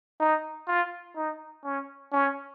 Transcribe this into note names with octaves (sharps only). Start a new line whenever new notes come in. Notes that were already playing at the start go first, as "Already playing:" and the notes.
D#4
F4
D#4
C#4
C#4